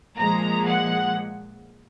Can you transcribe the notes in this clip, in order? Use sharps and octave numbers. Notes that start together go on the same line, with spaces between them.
A#2 F3 G#3 A#5
F#5